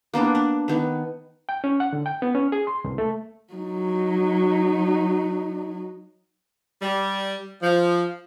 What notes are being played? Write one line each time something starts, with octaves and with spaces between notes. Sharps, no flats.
A#3 B3 D4
D4
D#3 B3
G5
C#4
F#5
D3
G5
B3
C#4
G#4
C6
C2
A3
F#3 D#4
G3
F3